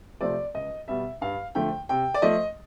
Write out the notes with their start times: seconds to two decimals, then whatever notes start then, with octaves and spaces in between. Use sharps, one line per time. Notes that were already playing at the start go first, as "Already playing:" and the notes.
0.21 C3 F3 A3 C4 D5
0.54 C#2 D#5
0.88 B2 G3 E5
1.21 G2 F5
1.55 D3 F3 A3 G5
1.89 C3 G5
2.14 D5
2.22 F3 A3 D#5